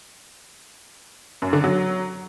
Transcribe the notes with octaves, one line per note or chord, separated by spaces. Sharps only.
F#2
D3
F#3